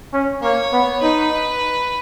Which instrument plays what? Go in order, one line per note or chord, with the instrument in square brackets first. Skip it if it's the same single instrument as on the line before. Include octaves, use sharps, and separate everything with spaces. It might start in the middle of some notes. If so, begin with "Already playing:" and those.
[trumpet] C#4
[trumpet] A#3 [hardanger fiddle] C#5
[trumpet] B3
[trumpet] D#4 [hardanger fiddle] B4